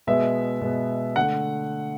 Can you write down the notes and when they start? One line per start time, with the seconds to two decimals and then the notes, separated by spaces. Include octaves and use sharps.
0.07 B2 G#3 B3 E5
0.62 B2 G#3 B3
1.16 D3 A3 F#5